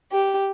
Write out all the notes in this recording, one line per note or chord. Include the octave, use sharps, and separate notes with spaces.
G4